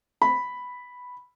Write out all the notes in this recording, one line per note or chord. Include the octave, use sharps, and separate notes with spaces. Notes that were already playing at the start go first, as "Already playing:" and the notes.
B5